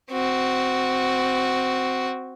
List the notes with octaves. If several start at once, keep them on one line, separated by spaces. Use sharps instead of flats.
C4 F#4